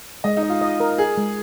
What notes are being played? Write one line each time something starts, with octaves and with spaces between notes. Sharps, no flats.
G#3 D#5
D#4
D#5
F4
D#5
A#4
G#4 A#4
G#3